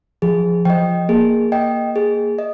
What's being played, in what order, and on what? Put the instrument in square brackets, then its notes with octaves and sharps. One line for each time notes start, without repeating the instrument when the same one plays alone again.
[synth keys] F3 [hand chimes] G#4
[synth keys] F3 [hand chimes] D#5 G5
[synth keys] A#3 [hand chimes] G#4
[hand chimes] D#5 G5
G#4
D#5